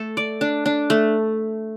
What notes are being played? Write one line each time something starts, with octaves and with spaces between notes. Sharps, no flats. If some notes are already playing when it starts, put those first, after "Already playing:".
Already playing: A3 A4
D5
D4
D4
A3